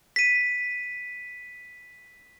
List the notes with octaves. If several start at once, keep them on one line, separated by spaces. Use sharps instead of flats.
B6 D#7